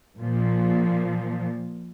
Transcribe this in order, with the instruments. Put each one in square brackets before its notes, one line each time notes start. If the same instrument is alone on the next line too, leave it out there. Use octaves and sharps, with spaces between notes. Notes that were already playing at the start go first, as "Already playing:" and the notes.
[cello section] A#2 F3